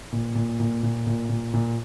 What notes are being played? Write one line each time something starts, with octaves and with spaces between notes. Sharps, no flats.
A#2
A#2
A#2
A#2
A#2
A#2
A#2